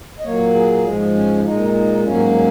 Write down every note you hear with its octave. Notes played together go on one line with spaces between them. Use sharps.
D#5
A#2 F#3 A#3 C#5
G#4
G#2 F3 G#3
C#4
A#2 G#3 D#4
D#4
G#2 F#3 A#3 C#4
C#4